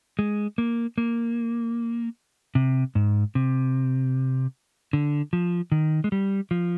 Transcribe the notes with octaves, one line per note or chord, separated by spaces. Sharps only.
G#3
A#3
A#3
C3
G#2
C3
D3
F3
D#3
G#3
G3
F3